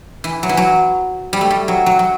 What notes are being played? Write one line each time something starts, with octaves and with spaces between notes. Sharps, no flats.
E3
F#3
E3
F#3
G3
A3
G3
F#3
F#3
F#3